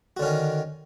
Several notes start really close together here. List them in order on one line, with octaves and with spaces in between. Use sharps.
F#4 D3 C#4 D#3